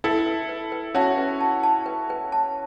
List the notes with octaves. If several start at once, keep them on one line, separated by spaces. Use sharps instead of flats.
E4 A4 B4
B4
B4
B4
C#4 F#4 A5
B4
A5
A5
B4
B4
A5